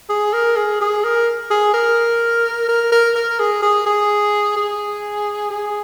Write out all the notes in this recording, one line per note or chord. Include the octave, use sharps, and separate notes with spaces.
G#4
A#4
G#4
G#4
A#4
G#4
A#4
A#4
A#4
A#4
G#4
G#4
G#4
G#4
G#4